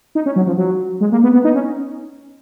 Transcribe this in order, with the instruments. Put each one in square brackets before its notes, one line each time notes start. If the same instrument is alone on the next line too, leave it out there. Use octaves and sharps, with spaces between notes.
[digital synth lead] D#4
C#4
F#3
F3
F#3
G#3
A#3
B3
B3
D#4
C#4